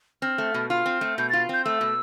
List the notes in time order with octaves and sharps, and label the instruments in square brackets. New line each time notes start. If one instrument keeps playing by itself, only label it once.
[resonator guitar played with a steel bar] C4 [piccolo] F6
[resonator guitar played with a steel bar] A3
B2
[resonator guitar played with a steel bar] F4 [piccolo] F6
[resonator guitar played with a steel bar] C4
A3
[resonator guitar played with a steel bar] B2 [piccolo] G6
[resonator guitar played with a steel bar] F4 [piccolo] A6
[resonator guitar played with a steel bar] C4 [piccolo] G6
[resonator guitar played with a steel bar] A3 [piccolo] E6
[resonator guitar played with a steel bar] B2